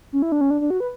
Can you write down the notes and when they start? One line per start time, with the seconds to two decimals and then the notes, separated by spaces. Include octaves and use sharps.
0.13 C#4
0.22 E4
0.32 D4
0.41 C#4
0.50 D4
0.61 D4
0.70 F#4
0.80 B4